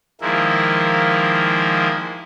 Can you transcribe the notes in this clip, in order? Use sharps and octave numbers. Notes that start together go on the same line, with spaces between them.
D#3 F3 G#3 A#3 E4